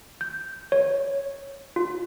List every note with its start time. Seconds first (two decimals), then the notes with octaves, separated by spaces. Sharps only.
0.21 G6
0.72 C#5
1.76 F4